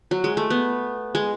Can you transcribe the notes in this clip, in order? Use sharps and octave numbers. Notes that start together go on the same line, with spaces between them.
F#3
G#3
A3
B3
G#3